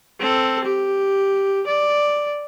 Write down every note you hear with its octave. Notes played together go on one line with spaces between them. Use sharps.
C4 A4
G4
D5